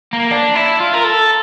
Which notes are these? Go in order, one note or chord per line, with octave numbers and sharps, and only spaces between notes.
A#3
D4
E4
F4
A#4
A4